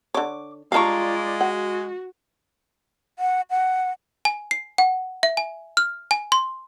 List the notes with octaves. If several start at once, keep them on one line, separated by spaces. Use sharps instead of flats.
D3 C#5 D6
G3 G#3 D4 F4 D5 F5 A#5 C#6
F#4 F#5
F#5
F#5
G#5
C7
F#5
E5
G#5
F6
G#5
C6